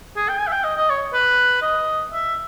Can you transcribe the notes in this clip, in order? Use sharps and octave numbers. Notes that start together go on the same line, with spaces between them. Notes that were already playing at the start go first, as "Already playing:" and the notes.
G#4
G5
G#5
E5
G5
D#5
D#5
C#5
B4
D#5
E5